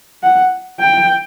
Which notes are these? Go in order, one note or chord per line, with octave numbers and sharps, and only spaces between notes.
F#5
G5